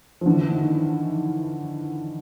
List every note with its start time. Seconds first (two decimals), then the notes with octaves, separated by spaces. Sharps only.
0.21 F3
0.26 D3 E3
0.55 D#3